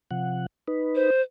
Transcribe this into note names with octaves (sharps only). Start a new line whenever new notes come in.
C3 F3 F#5
D#4 B4
C5